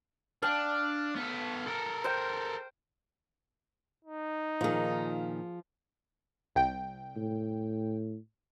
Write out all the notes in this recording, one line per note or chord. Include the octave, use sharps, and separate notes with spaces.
D4 F5 G5 A5
B3 A4
A4 A#4
C5 G5
D#4
A#2 D#3 F3 G#4
C2 G5
A2